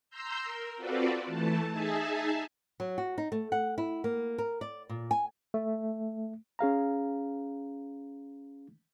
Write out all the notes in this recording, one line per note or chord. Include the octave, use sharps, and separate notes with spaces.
A#5 C6 E6 G6
A#4
C4 F4 F#4 A4 B4 D5
E3 A3 A5
D#4 G#4 E5 G#5 A5
F#3
F#4
D#4
A3
F#5
E4
A#3
A#4
D5
A#2
G#5
A3
C#4 G#4 F5 A#5